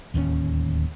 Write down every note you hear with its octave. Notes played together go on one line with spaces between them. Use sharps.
D1 D#2 C#3 C#4